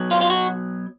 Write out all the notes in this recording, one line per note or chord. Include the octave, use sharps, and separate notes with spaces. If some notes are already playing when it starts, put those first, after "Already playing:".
Already playing: B2 F#3
F4
F4
F#4